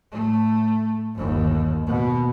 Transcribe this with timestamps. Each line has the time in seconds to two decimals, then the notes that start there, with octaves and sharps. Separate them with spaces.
0.11 A2 A3
1.15 G1 D#2
1.87 B2